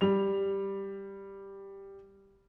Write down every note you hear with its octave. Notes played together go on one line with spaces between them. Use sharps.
G3 F7